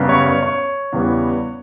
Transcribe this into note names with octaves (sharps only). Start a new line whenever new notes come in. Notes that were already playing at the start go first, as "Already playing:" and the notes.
Already playing: F#2 C#3 G3 B3
C#5
C#5
C#5
E2 C#3 G3 B3